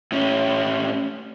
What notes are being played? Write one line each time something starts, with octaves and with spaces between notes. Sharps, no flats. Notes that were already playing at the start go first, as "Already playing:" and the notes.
A2 C#4